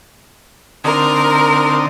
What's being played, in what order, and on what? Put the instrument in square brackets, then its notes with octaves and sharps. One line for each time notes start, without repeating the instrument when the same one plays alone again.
[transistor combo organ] D3 C4 D#4 [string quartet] A#4